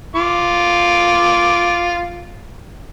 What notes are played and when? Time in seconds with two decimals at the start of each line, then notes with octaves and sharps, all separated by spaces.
0.15 F4 D6